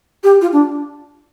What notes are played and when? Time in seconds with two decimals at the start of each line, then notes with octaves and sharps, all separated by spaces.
0.24 G4
0.41 F4
0.53 D4